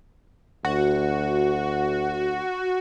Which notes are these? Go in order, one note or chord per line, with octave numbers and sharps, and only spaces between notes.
D2 F#4